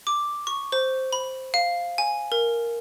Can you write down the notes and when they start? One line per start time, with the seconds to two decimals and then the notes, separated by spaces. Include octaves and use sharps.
0.07 D6
0.47 C#6
0.72 C5
1.13 B5
1.54 F5
1.98 G#5
2.32 A#4